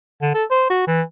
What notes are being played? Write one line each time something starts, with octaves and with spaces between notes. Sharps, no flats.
D3
A4
C5
F#4
E3